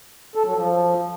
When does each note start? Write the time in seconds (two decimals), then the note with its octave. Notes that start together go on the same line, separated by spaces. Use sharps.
0.35 A4
0.45 F#3
0.55 F3